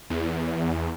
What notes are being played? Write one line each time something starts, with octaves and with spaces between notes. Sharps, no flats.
E2